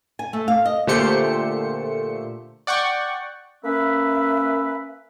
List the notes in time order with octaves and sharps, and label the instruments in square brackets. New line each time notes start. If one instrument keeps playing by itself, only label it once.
[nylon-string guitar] G#5
A3
F5
D#5
[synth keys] A#2 D3 A3 G4 C5 C#7
D5 F#5 G5 C#6
[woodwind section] A#3 C#4 B4 E5